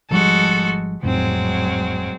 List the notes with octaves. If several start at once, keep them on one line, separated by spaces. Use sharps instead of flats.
G#1 F3 G3 G#3 F#4 A4
G#1 F2 A2 F#3 G#3 C4